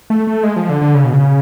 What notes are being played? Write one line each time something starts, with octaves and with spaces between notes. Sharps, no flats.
A3
A3
G#3
F3
D3
D3
C#3
B2
C#3